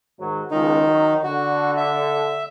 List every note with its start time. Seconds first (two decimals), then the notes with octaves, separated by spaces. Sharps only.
0.20 G#2 D#3 F#3
0.51 C#2 D#3 D#4
0.87 F#3
1.24 D3 F#4
1.77 E5